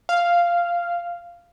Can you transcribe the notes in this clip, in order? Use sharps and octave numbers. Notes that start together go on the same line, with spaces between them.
F5